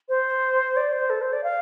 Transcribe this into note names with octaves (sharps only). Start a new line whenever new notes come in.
C5
D5
C5
A4
C5
D5
F5